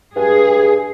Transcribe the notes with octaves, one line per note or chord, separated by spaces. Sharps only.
G2 G#4